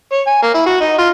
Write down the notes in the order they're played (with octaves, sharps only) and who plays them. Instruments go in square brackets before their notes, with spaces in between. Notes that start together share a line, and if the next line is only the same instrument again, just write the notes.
[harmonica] C#5
G#5
A#3
E4
F#4
D#4
F4